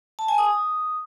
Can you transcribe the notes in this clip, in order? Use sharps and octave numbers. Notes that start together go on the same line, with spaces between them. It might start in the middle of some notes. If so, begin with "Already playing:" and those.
A5
G#5
D#6